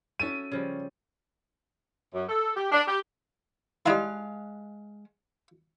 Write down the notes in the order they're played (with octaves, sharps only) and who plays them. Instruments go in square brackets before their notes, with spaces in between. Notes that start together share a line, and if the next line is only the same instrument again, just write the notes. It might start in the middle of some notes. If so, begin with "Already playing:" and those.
[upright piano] C#4 D#7 [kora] F#4 A4 E5
[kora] C#3 F3 G3
[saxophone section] F#2
A4
G4
D4
G4
[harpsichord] G3 D#4 E4 [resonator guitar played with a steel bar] G#3 F5